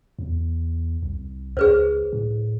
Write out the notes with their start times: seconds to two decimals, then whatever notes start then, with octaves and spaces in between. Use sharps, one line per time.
0.19 E2
1.03 C2
1.57 C#2 G#4 B4 C5
2.13 A2